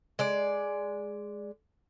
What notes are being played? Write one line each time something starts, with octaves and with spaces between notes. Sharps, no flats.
G#3 D5